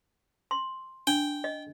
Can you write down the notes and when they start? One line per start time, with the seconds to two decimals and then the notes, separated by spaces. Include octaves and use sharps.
0.51 C6
1.07 D4 G5
1.44 D#5